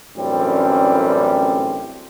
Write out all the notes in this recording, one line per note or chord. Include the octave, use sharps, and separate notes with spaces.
A1 F#2 A2 D3 G3 C4